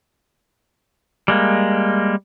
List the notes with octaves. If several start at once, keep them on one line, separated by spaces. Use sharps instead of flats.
G3 G#3 A#3